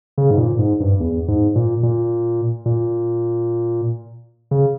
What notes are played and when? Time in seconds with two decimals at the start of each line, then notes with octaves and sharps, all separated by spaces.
0.18 C#3
0.31 G#2
0.38 A#2
0.59 G#2
0.80 G2
1.00 E2
1.28 G#2
1.55 A#2
1.83 A#2
2.66 A#2
4.51 C#3